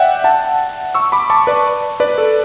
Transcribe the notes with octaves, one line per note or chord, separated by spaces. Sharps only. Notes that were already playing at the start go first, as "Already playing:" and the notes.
Already playing: D5 E5 F#5 G5
F#5 A5
C#6 E6
B5 D6
A5 C#6
B4 D5
B4 D5
A4